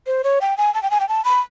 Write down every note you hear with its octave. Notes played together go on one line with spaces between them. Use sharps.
C5
C#5
G5
G#5
A5
G5
G#5
G5
A5
B5